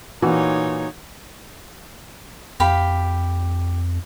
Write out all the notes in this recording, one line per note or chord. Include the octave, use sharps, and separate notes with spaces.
A#2 E3 D#4 F#4 C#5
F2 G4 F5 B5